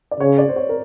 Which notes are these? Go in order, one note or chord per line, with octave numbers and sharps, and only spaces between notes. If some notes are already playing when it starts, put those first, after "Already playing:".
D5
C#3 C#5
D5
C5
C#5
A#4